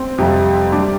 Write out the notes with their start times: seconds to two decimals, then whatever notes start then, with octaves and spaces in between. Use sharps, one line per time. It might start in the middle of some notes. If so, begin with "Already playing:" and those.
Already playing: C4
0.18 F2 C3 G3
0.72 G3 D4